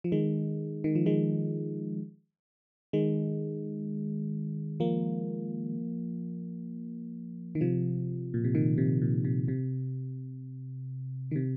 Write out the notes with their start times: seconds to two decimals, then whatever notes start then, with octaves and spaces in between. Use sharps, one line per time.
0.04 F3
0.12 D#3 G#3
0.84 D#3
0.95 F3
1.06 D#3 G#3
2.93 D#3 G#3
4.80 F3 A#3
7.55 D#3
7.61 C3 F3
8.34 A#2
8.44 C3
8.55 A#2 D#3
8.78 C3
9.02 A#2
9.25 C3
9.48 C3
11.31 D#3
11.36 C3